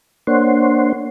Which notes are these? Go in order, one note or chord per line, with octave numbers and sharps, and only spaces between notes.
A#3 D4 C5 C#5 F#5 C6